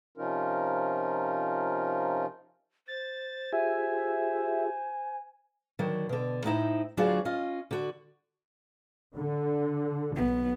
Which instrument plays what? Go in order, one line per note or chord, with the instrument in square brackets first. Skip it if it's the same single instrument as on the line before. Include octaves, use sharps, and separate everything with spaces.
[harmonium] C3 F3 C#4 D#4 F4 A#4
[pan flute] C5 [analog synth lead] A6
[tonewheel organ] F4 G4 G#4 [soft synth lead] E5 [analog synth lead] G#5
[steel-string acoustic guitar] D3 D#3 F#3
B2 D3
A2 D#4 E4 C5
D2 F#3 D4 F4 F#4 G#4
C#4 F4 D#5
D3 F#4
[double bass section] D3
[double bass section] B1 [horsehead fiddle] B3